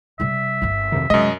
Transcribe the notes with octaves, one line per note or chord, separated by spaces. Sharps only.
C3 G3 E5
G1 A#3
F2 C3 D#3
F#2 C3 G#3 D#5